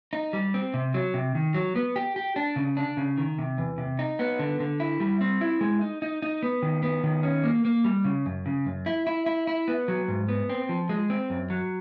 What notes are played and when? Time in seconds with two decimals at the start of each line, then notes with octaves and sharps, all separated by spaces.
0.13 D#4
0.33 G3
0.54 C4
0.74 C3
0.94 F#3
1.14 C3
1.35 D#3
1.54 F#3
1.76 B3
1.96 G4
2.16 G4
2.36 D4
2.56 C#3
2.77 D4
2.97 C#3
3.18 D#3
3.39 C3
3.58 E2
3.78 C3
3.99 D#4
4.19 B3
4.39 D3
4.60 D3
4.80 E4
5.00 G3
5.21 C4
5.41 E4
5.61 G#3
5.81 D#4
6.02 D#4
6.22 D#4
6.43 B3
6.62 D#3
6.83 B3
7.04 D#3
7.23 C#4
7.44 A#3
7.65 A#3
7.84 G3
8.05 C#3
8.26 F#2
8.46 C#3
8.66 F#2
8.86 E4
9.07 E4
9.26 E4
9.47 E4
9.68 B3
9.88 F#3
10.08 G#2
10.28 B3
10.49 C4
10.69 F3
10.89 G#3
11.10 C4
11.30 F#2
11.50 F#3